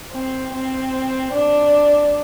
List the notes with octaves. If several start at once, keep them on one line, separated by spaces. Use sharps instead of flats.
C4
C4
D4